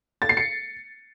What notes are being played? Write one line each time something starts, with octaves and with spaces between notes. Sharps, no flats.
A6
C7
C#7